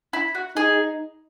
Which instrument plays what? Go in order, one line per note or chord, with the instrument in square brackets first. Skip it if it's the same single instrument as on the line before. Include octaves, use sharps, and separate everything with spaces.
[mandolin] E4
F#4
[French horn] D#4 [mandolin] G#4